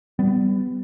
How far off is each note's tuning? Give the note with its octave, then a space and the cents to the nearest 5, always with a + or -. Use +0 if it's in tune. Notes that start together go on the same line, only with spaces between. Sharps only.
G3 -5 B3 +20